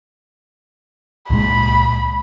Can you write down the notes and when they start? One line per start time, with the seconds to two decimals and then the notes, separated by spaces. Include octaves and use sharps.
1.30 C#2 A#2 G#3 B5